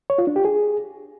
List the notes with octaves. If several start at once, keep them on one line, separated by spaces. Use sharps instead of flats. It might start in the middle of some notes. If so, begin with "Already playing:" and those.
C#5
F4
D4
G4
G#4